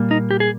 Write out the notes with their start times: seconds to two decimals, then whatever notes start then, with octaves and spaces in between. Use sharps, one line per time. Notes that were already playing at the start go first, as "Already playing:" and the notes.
Already playing: A#2 G3 A#3
0.11 D#4
0.31 G4
0.40 G#4